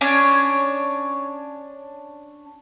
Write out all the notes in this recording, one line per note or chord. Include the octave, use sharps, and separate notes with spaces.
C#4 D4 C#5